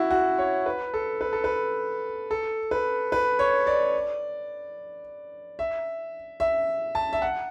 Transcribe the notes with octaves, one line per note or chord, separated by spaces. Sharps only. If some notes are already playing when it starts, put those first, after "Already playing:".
Already playing: E4 F#4
F#4
C#5
B4
A4
B4
A4
B4
A4
B4
B4
C#5
D5
E5
E5
A5
E5
F#5